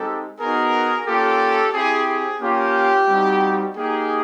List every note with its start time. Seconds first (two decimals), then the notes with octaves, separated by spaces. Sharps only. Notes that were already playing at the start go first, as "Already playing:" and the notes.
Already playing: G#3 C4 D#4 G4 A4
0.40 B3 D#4 F#4 G#4 A#4
1.07 A#3 C#4 F4 G4 A4
1.74 C4 E4 G4 G#4
2.07 G#4
2.41 A#3 C#4 F4 G4
3.08 G3 C4 D#4 F#4
3.76 A#3 D#4 G4 G#4